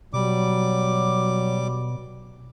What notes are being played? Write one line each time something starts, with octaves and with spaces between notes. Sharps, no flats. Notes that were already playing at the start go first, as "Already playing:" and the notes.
B2 F#3 G3 D6